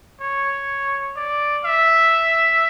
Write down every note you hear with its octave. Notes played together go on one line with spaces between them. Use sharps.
C#5
D5
E5